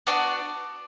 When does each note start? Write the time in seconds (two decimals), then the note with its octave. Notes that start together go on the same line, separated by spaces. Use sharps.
0.07 B3 D4 F#4 D5